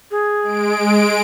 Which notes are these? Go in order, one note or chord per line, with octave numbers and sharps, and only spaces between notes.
G#4
G#3 D7